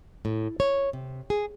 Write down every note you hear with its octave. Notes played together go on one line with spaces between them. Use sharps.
A2
C#5
C3
G#4